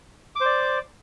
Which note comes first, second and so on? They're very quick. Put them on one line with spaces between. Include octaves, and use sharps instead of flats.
D6 C5 D5